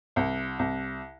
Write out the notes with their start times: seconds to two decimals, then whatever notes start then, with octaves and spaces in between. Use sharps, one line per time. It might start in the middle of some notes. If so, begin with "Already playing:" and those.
0.16 C2
0.59 C2